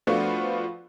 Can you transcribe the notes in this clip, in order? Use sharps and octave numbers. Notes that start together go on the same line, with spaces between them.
F3 A3 B3 D4 F4 F#4